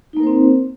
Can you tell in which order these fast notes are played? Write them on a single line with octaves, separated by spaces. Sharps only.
D#4 A#3 A#4 C5 C4